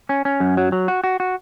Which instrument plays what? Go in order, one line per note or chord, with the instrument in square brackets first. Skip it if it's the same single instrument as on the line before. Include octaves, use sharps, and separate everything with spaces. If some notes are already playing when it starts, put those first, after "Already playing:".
[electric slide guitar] C#4
C#4
F#2
F#3
F#3
F#4
F#4
F#4